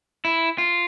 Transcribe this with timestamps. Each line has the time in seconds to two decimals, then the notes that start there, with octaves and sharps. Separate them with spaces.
0.25 E4
0.58 F4